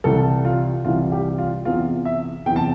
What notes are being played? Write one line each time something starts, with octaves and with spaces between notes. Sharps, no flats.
C2 C3 E3 G3 A4
F4
C2 C3 E3 G3 F4
G4
F4
E2 C3 E3 F4
E5
E2 C3 E3 G5
A5